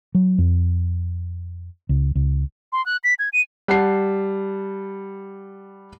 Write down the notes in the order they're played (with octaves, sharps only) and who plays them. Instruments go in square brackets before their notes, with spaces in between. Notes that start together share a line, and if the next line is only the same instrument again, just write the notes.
[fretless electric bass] F#3
F2
C#2
C#2
[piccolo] C6
F#6
B6
G#6
D#7
[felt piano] G3 F#5 A5 C7